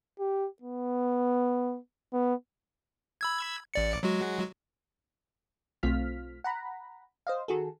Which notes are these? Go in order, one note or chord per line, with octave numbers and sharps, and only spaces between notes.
G4
B3
B3
B5 E6 G#6
A1 D5 C#7
F#3 G#3 F#4
B1 A3 C4 F4 F6 B6
F#5 A#5 B5
C5 D#5 F5
D#3 F#4 G#4 A4